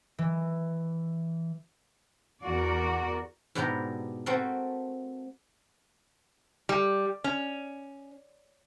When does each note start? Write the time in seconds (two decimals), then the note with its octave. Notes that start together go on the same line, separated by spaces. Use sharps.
0.18 E3
2.44 E2 F#4 A#4 D5
3.55 G#2 B2 D4 E4 G4 A#5
4.26 A3 C4 F#4 A4 A#4
6.69 G3
7.24 C#4